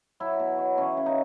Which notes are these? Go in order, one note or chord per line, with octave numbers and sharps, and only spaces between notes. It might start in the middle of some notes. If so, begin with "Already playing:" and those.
F#3 E4
B2
F#3
E3 C#4
C#3
D#4